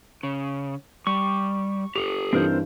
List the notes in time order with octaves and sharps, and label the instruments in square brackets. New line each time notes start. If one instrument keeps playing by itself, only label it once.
[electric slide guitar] C#3
[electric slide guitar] G3 [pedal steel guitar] C#6
[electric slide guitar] G4 A4 [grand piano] F7
[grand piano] G2 E3 D#4 [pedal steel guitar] C4 A#4 C5